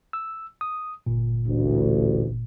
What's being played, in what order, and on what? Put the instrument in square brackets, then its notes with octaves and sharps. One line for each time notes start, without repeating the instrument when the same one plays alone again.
[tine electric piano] E6
D#6
G1 A#2
[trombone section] A1 D2